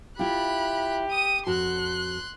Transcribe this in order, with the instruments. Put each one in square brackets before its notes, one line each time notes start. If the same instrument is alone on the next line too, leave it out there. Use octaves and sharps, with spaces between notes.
[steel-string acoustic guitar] E4 F4 [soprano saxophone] G4 [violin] B5 F#6
[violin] D#6 D#7
[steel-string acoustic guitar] F2 F#4 A5 [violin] C6 F#6